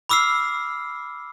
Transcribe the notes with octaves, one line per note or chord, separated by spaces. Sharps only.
B5 D6 E6 F6 C7